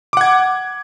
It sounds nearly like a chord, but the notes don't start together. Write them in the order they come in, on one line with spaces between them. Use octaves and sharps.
D6 F#5 G#6